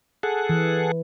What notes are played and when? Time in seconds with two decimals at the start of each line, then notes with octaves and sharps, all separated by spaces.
0.23 G#4 A4 F#5
0.49 E3